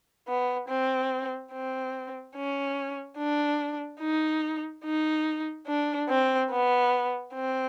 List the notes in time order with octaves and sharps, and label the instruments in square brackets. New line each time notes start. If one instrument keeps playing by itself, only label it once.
[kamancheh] B3
C4
C4
C#4
D4
D#4
D#4
D4
C4
B3
C4